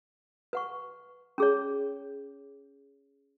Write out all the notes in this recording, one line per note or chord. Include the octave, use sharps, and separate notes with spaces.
B4 F#5 C#6
C#4 G#4 C#5